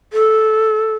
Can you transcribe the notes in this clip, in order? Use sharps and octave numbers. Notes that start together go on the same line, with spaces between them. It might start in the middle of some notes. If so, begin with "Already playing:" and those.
A4